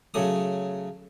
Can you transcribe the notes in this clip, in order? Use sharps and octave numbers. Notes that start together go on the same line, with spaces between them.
C#3 F#3 A3 D#6